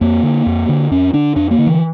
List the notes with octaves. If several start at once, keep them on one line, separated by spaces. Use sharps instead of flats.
F2 A#3
D3
F2
D3
F2 C#4
D3 D4
F2 D4
A#3
D3
E3